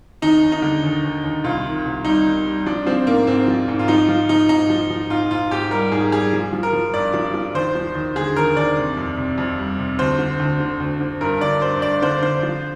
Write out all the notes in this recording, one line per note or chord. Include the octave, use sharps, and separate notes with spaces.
D#2 D#4
D#2
D#4
D3
D#2
D#2
D#2
C2 F4
D#3
C2
G3 D#4
D#3
G3
F3 D4
F3 C4
G#2 A#3
G#2 C4
F3
G#2
F4
F3 D#4
F3 F4
F3 D#4
G#2 D#4
F3
F3
G#2 F4
G#2 F4
G#2 G4
G3 A#4
G#2 G#4
G3 G#4
F3
F3
A#4
F3
G2 D5
F3
F3
D#2 C5
F3
D#2
D3 G#4
D#2 A#4
D#2 D5
C3
F2
C3
F2
G3
C3
D2 C5
D3
D2
D3
D2
D3
G2 A#4
D3 D5
G2 C5
G2 D5
D3 C5
D3 C5
F3